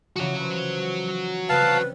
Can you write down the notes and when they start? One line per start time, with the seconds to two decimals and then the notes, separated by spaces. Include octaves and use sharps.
0.16 C#3 E3 F3 F#4 C#5
0.40 B4 C5
1.49 C#3 G3 C4 B4 F5 A5